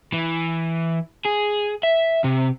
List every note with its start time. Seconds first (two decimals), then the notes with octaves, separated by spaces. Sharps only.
0.12 E3
1.25 G#4
1.83 E5
2.24 C3